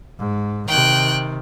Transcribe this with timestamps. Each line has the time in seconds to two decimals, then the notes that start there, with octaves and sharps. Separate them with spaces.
0.18 G#2
0.68 C3 D#3 G5 F#6